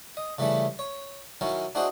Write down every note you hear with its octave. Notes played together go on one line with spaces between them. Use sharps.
D#5
C#3 E3 G3 A3 E4
C#5
D#3 F#3 C#4 E4
D4 E4 F#4 G#4 C5 D#5